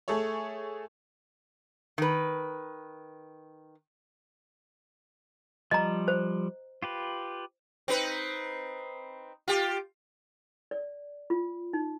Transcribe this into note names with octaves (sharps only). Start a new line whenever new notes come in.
A3 G#4 A4 C#5
D#3 B4
F3 G3 D#5 A#5
C5
F4 G4 B4
C4 D#4 B4
F4 G4
D5
F4
D#4